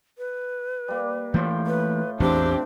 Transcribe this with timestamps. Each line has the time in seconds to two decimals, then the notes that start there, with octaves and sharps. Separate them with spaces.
0.18 B4
0.88 G3 A#3
1.34 A2 E3 A3 A#3 F4 G5
1.67 B4
2.20 A1 E2 E3 C4 D4 G4